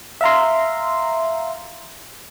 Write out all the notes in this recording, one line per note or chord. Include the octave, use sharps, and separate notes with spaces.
E5 F5 A#5 C6